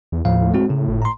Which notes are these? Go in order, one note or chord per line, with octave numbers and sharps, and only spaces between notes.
E2
D#2 A2 F3 F5
G#3 C4 F#4
C#3
G1 A2
A#5 C6